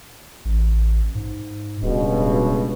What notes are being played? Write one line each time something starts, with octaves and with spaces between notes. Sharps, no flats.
A1
G#2
D1 C#2 G2 B2